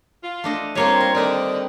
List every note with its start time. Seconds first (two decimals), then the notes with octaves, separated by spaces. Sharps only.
0.23 F4
0.44 A3 D4 D#5
0.75 G3 A#3 C4 F4 C#5
1.01 A#4
1.15 D3 D#3 C4 B4 D5